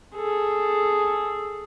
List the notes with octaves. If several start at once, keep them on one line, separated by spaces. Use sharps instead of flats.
G#4 A4